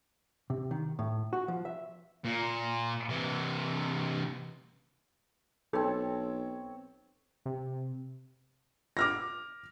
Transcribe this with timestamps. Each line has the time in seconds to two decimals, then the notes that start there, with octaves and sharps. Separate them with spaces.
0.50 C3
0.71 D#3
0.99 A2
1.33 F#4
1.48 F3
1.65 E5
2.25 A#2
3.09 C3 E3
5.73 B1 C4 A4 C#5
7.45 C3
8.97 D6 F6 A#6